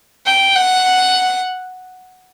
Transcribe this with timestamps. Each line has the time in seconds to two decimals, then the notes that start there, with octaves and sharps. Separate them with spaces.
0.26 G5
0.56 F#5